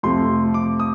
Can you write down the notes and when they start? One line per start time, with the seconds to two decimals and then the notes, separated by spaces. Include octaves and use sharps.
0.03 F2 C3 F3 A3 C6
0.54 D6
0.80 D#6